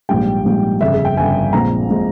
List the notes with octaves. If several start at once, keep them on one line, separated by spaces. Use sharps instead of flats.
A#1 G#2 G3 G5
A#1 G#2 G3
G1 F2 C#3 E5
G#4
G5
G1 F2 C#3 G#5
A#1 A#2 G#3 C4 A#5
A#2 G#3 C4